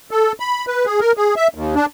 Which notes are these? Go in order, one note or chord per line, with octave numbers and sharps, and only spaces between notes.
A4
B5
B4
G#4
A#4
G#4
E5
D#2
D4